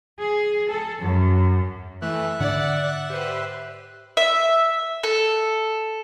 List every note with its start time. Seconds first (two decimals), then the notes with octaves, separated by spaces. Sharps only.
0.18 G#4
0.70 A4
1.01 F#2
2.02 E3 A3 E5 F#6
2.40 G#2 D3 D4 D5 F#5
3.10 G4 B4 C5
4.17 E5
5.03 A4